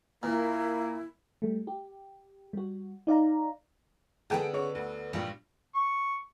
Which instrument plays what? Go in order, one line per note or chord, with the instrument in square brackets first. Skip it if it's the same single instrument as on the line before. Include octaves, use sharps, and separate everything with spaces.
[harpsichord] A#2 [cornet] A#3 [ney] E4
[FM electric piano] G3 A3
G4
G3 F#4
D#4 D5 F5 A#5
[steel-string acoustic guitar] D3 B3 D4 [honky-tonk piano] G#4 A4 G5
[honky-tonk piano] C#3 C#5
D2
[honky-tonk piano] A#1 G2 F4 [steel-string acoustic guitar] G3
[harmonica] C#6